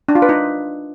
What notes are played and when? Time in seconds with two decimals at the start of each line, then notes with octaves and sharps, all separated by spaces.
0.09 D4
0.15 F4
0.22 B4
0.29 D#4